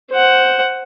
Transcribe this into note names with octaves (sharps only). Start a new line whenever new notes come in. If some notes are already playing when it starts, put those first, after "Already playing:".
C5 F#5